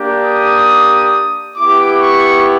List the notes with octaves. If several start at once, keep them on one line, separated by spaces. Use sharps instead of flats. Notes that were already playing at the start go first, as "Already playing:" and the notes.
Already playing: A#3 D4 G4
D#6
B3 E4 G4 D6
C#6